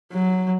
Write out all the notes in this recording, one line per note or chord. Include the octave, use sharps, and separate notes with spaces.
F#3